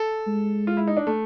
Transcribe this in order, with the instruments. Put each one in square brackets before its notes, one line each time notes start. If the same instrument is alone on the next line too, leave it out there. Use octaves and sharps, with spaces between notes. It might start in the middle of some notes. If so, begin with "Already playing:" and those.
Already playing: [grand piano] A4
[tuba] G#3
[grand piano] F4
E4
D#4
D4
A3